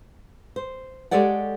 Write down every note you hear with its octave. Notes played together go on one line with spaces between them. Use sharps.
C5
G#3 G4 A4 C#5 D5 F#5